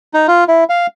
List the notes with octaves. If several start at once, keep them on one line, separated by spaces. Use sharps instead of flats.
D#4
F4
E4
F5